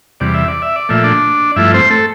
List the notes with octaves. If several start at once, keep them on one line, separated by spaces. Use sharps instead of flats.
E2 C3 G3 D5
E5
D5
E5
D5
A#2 F3 A3 E5
D4 D5
G2 F3 A3 E4 E5
C4 C5
A3 A4